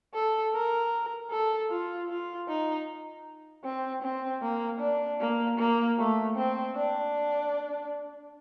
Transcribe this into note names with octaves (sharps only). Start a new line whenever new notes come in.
A4
A#4
A4
F4
F4
D#4
C4
C4
A#3
D4
A#3
A#3
A3
C4
D4